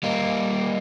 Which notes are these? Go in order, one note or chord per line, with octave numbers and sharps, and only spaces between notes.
G3 A#3 D#4